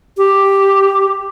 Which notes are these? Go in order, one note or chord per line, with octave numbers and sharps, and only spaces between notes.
G4